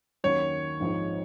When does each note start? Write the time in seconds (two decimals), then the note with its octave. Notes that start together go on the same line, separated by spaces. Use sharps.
0.24 D#2 D#3 F#3 C#4 C#5
0.80 A#1 G#2 F3 C4 D#4